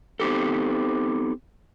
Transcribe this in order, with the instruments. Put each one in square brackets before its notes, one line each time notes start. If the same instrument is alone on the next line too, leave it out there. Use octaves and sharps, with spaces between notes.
[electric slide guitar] B3 C4 D#4 G4 A4